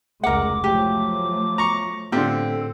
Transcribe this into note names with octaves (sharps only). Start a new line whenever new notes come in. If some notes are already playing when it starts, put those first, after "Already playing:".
F1 C#2 G#3 A#4 F#5 D6
F3 F#3 A3 G4
A#5 C#6
A2 D3 C4 F4 G4 A4